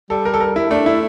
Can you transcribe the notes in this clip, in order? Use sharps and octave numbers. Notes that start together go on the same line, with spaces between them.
G3 A4
A#4
A4
A#4
E4
A3 D4
E4